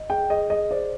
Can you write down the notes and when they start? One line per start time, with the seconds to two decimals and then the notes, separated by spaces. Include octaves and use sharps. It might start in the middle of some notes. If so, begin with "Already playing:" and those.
Already playing: D#5
0.10 G#4 G5
0.30 G#4 D#5
0.50 G#4 D#5
0.71 C5 D5